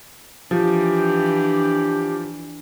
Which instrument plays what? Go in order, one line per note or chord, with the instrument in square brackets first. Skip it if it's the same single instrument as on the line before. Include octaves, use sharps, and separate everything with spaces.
[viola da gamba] E3 D4 [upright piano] F3 [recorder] G4